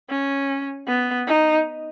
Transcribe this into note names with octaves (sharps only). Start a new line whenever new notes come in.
C#4
B3
D#4